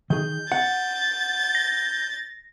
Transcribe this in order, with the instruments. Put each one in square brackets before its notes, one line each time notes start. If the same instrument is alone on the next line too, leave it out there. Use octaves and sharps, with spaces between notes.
[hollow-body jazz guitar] D#3 G#4 [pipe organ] G6
[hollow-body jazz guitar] F#5 [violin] A6
[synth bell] A#6